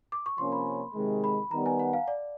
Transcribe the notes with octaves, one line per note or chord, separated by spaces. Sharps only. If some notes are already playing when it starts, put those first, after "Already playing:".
D6
C#6
C3 F3 A#3 C#4 C6
B5
C3 D#3 G#3
B5
D#3 G3 B3 A#5
G#5
F#5
F5
D5